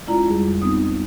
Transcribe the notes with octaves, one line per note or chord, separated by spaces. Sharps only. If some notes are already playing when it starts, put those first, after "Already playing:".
G#3 C#4 E4 F4 D5 A#5
F2 G3 G#4
B3 C4 D#4 D#6